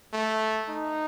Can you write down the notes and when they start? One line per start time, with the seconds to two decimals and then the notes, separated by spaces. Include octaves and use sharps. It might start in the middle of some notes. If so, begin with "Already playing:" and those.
0.13 A3
0.69 D#4